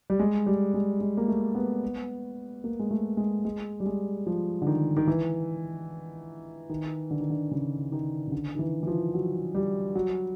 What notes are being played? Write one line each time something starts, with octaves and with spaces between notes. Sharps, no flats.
G3
G#3
G3
G#3
G#3
A#3
A3
B3
A#3
G#3
A3
G#3
G#3
G3
G#3
F3
D3
D#3
D#3
E3
D#3
D3
D#3
D3
C#3
D#3
C#3
D3
D#3
E3
E3
F3
F#3
G3
F#3